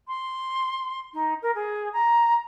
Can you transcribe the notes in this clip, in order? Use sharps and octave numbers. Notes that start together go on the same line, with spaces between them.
C6
D#4
A#4
G#4
A#5